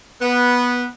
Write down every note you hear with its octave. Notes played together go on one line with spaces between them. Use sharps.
B3